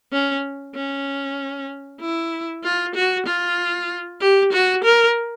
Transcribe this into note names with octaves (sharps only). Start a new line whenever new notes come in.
C#4
C#4
E4
F4
F#4
F4
G4
F#4
A#4